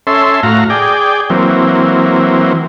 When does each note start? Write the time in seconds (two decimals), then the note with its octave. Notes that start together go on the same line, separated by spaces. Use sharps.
0.07 C#4 A4 E5 C6
0.43 A2 F#4 F5 A#5
0.70 G#4 D5 G5
1.30 E3 F#3 A#3 C4